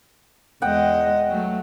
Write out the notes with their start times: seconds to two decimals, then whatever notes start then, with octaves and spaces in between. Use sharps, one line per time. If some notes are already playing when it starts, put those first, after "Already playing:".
0.62 E2 G#3 D#5 F#5 G5
1.29 F#3 A3